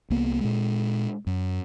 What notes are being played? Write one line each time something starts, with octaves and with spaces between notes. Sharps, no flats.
C2 A#3 B3
A#2 G#3
F#2